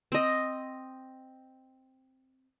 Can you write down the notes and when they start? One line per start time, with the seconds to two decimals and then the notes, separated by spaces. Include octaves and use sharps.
0.12 C4 D#5